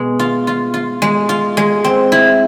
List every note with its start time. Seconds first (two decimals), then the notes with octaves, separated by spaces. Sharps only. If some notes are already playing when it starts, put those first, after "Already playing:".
Already playing: B2 G#3
0.19 F4
0.47 F4
0.74 F4
1.02 G#3
1.29 F4
1.57 G#3
1.84 C4
2.12 E4